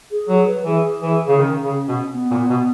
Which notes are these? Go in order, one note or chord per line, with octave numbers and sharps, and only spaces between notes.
G#4
F#3 G#4
B4
E3 G#4
E3
C#3
D#3 C#4
C#3
B2
B3
A#2
B2